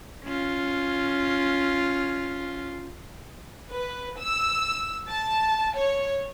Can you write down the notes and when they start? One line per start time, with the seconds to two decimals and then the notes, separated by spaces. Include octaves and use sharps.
0.25 C#4 F4
3.71 B4
4.18 E6
5.09 A5
5.77 C#5